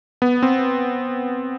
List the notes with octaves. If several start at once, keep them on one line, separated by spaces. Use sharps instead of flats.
B3
C4